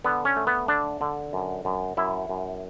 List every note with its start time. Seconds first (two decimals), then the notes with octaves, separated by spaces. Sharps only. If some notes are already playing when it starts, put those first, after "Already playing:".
0.04 D3 B3
0.25 C#4
0.36 A3
0.47 B3
0.68 D3 D4
1.01 D3
1.33 F#2
1.65 F#2
1.97 F#2 E4
2.29 F#2